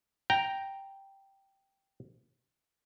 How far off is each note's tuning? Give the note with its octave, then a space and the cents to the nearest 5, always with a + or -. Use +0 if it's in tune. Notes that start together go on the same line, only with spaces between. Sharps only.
G5 +0 A#5 +0